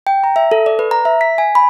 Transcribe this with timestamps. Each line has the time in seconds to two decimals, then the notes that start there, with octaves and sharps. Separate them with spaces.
0.07 G5
0.24 A#5
0.36 E5
0.51 A4
0.66 D5
0.79 B4
0.91 A#5
1.05 E5
1.21 B6
1.38 G#5
1.55 B5